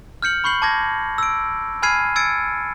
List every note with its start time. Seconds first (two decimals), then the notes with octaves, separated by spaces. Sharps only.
0.22 F6 G6 C#7 F#7
0.44 B5 C#6 G6 C7 F#7
0.62 A5 D6 G#6 A#6
1.18 E6 D7
1.82 G#5 B5 F6 G#6 C7 D#7
2.16 E6 G#6 A6 C#7 D7